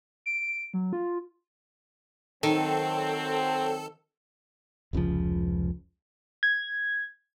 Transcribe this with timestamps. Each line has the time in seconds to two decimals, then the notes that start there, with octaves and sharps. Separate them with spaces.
0.26 D7
0.74 F#3
0.93 F4
2.43 D#3 F#3 C4 A4
4.93 F1 C#2 C#3 F3
6.43 G#6